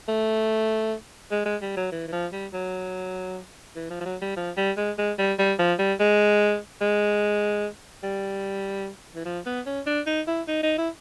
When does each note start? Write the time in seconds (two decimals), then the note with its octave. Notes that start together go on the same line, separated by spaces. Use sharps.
0.08 A3
1.31 G#3
1.46 G#3
1.62 G3
1.77 F#3
1.92 E3
2.08 E3
2.13 F3
2.33 G3
2.54 F#3
3.76 E3
3.90 F3
4.01 F3
4.06 F#3
4.22 G3
4.37 F3
4.57 G3
4.77 G#3
4.98 G#3
5.19 G3
5.39 G3
5.59 F3
5.79 G3
6.00 G#3
6.81 G#3
8.04 G3
9.15 E3
9.25 F3
9.46 B3
9.66 C#4
9.86 D4
10.07 D#4
10.28 E4
10.48 D#4
10.63 D#4
10.78 E4